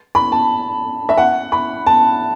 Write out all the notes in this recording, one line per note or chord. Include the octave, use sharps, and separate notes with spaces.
B5
A5
E5
F#5
B5
A5